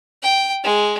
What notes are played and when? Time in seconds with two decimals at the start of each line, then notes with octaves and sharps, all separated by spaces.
0.23 G5
0.64 G#3